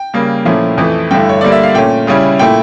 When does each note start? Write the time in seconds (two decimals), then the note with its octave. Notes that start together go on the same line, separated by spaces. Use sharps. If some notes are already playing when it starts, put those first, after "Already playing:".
Already playing: G5
0.14 C#3 G3 A#3
0.45 A#2 F3 A3 C#4 E4
0.77 F2 E3 A3
1.11 G2 D3 A3 E4 G5
1.29 C#5
1.41 D3 G3 A#3 D5
1.52 E5
1.63 F5
1.74 A#2 A3 C#4 G5
2.07 C#3 G3 C#4 E4
2.39 A#2 A3 E4 G5